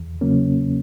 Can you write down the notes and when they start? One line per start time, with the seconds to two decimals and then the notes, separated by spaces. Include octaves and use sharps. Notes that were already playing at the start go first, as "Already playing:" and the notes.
Already playing: E2
0.21 C#3 F#3 A#3 C#4